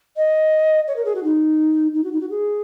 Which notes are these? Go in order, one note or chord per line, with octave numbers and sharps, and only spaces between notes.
D#5
C#5
A#4
G#4
F#4
D#4
D#4
F#4
D#4
F#4
G#4